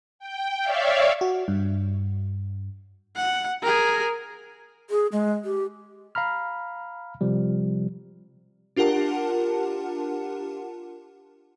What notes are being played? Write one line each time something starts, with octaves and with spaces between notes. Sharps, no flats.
G5
C#5 D5 E5 F5
F#4
G2
F#5
G#4 A#4
G#4
G#3
G4
F5 A#5 B5 F6
C3 F3 G3
D4 F4 G4 A#4 F#5 A5